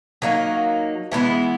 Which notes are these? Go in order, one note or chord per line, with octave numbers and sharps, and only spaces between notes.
F#3 A#3 D#4
E3 G#3 B3 E4